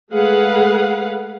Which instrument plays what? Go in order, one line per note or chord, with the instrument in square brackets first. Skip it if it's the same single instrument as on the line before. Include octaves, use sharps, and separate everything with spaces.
[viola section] G#3 A3 G#4 B4 F5 F#5